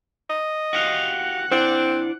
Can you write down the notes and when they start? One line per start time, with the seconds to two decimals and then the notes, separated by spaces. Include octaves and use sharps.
0.30 D#5
0.73 F#4 G4 F5 F#5
1.51 C4 D4 E4 C5 D5